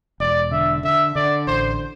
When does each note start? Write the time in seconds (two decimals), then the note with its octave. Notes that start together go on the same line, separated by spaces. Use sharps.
0.20 E1 D5
0.52 D3 E5
0.83 D3 E5
1.16 D3 D5
1.47 A1 C5